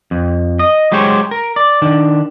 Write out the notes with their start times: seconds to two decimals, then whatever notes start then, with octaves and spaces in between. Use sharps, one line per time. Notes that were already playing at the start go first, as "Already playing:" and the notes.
0.11 F2
0.59 D#5
0.92 F#3 G#3 G4 C5 C#5
1.31 A#4
1.56 D5
1.82 D#3 D4